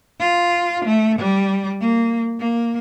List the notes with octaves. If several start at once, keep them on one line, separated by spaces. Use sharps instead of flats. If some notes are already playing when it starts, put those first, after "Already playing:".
F4
A3
G3
A#3
A#3